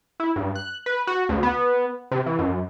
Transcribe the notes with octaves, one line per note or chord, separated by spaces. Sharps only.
E4
G2
F#6
B4
F#4
D2
B3
C3
E3
F#2